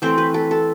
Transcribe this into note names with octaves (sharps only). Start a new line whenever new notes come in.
E3 A3 C4 C5
B4
A4
A4